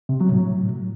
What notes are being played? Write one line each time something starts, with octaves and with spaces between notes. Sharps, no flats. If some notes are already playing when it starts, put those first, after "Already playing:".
C3
F#3
A2